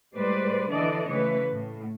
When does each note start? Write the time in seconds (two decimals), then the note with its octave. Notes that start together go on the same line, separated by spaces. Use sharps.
0.14 A2 G3 G#3 B4 C5 D5
0.70 D3 E3 D4 A4 D5 D#5
1.08 C#3 E3 A3 B4 C#5
1.51 A2